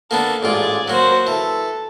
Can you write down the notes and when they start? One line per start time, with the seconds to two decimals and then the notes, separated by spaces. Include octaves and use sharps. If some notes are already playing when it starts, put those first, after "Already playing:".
0.11 A#3 B3 D4 A4
0.43 A1 G#2 F4 D5 G#5
0.88 F#3 A#3 F#4 C5
1.27 E3 A4